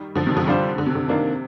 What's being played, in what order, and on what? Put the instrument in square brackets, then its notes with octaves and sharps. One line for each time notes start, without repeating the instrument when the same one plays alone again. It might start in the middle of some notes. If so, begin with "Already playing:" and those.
Already playing: [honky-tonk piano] D#3 G3
D3 F3
C3 D#3
D3 F3
[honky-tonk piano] D3 [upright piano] G3 D4 F4 C5
[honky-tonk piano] D3
C3
D3
[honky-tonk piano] C3 [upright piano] D#3 A#3 D4